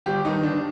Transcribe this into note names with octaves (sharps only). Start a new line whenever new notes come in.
G1 G4
G2 D#3 D#4
G1 D4